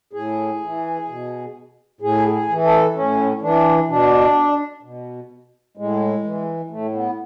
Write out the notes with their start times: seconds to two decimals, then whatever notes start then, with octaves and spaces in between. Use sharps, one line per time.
0.13 A2 G#4
0.61 E3
1.08 B2
2.01 A2 G#4
2.32 G#4
2.49 E3
2.65 A4
2.95 A2 C#4
3.42 E3 D4
3.88 B2 D4
4.83 B2
5.77 A2 G#3
6.24 E3
6.70 A2 A3
6.94 B3